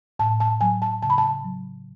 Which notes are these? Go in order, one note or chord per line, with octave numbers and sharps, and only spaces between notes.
A2 A5
A5
F#3 G#5
A5
C#3 A5
B5
A5
F#3